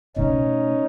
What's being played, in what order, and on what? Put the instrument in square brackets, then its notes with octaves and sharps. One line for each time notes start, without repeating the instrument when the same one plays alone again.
[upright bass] B2 A3 [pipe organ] C#4 D#4